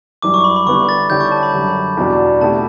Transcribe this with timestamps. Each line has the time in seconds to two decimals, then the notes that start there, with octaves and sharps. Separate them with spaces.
0.22 F#2 E3 G3 D6
0.34 C#6
0.44 B5
0.56 B5
0.66 D3 G3 B3 E4 C#6
0.89 A6
1.10 D3 G3 C#4 E4 G4 G6
1.20 C#6
1.31 A5
1.43 B5
1.54 F#2 D3 G3
1.97 E2 B2 G3 D4 F#4
2.41 B2 A3 E4 G4 A5